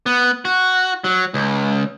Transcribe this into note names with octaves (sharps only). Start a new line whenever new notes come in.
B3
F#4
F#3
C#2